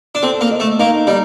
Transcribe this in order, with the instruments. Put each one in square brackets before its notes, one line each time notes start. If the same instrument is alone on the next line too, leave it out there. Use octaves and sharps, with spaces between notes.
[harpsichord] D4
[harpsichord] C4 [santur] A4
[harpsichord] A#3
[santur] D#5
[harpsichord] A3
[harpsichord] A#3 [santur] D#4
[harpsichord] G3 [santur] D#4